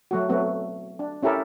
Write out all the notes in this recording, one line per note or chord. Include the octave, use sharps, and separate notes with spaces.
F#3 A3 F#4
F#3 A3 B3 C4 F#4
D4
C#4 E4 G4 A4 A#4